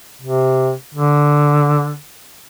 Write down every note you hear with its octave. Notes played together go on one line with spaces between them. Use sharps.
C3
D3